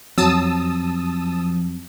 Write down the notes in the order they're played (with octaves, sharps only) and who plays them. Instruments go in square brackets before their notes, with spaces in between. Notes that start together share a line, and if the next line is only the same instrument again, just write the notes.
[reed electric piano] F2 F#3 [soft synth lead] F3 [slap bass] C4 [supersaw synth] A5 D#6 E6